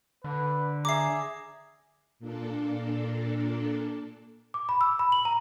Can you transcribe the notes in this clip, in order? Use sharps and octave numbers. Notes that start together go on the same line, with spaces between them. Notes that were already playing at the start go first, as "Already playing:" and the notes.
D3 B4
G#4 E5 A#5 D6 C7
A#2 A#3 D4 A4
D6
B5
E6
B5
F#7
A#5